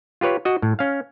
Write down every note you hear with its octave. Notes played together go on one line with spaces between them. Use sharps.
F4 G4 B4 C#5
F#4 D#5
A2
C#4 F5